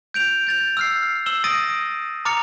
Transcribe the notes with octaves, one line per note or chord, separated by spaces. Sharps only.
G6 D7 F7
G6 A6 F7
E6 F6 C7
E6 E7 F#7 G7
D#6 A6 A#6 D7 D#7
A#5 D6 F6 A6 C#7 F7